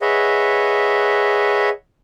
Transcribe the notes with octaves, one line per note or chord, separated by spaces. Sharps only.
G#4 B4 C#5 D#5 E5 F#5